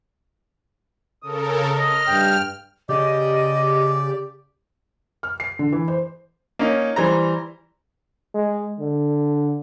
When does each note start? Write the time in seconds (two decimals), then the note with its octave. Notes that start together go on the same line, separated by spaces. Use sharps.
1.23 C#3 A4 A#4 D#6
1.78 D#5 F6
2.07 G2 G5
2.89 C#3 G4 D5 D#5
5.23 F6
5.40 C7
5.59 D3
5.72 E3
5.88 C5
6.59 A#3 C#4 D#4
6.96 E3 G3 C5 A#5
8.35 G#3
8.80 D3